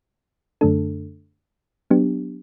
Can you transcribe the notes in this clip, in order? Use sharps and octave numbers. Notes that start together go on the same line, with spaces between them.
F#2 D3 A3 D4 A4
F#3 B3 D4 G4